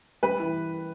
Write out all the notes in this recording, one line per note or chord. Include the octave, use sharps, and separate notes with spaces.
G3 B4
E3